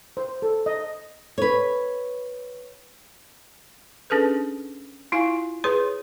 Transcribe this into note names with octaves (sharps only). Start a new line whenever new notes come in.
C5
A4
D#5
B4 C#5
C#4 D4 G#4 A4 B4
E4 F4 F5 G#5
G#4 B4 C#5 C6